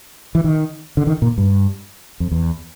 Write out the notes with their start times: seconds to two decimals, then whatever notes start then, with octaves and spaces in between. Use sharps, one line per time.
0.35 E3
0.44 D#3
0.97 D3
1.07 D#3
1.22 A#2
1.38 G2
2.20 F2
2.31 E2